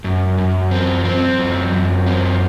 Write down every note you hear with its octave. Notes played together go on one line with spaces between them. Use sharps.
F#2
F#2
C4
C4
F#2
F#2
C4